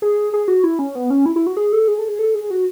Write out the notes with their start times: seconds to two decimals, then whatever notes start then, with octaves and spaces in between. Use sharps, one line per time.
0.02 G#4
0.33 G#4
0.48 F#4
0.64 E4
0.79 C#4
0.95 B3
1.10 C#4
1.26 E4
1.36 E4
1.47 F#4
1.57 G#4
1.73 A4
1.88 G#4
1.99 A4
2.08 G#4
2.19 A4
2.35 G#4
2.50 F#4